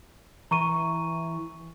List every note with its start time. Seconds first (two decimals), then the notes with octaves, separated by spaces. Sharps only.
0.51 E3 A#5 C#6 D#7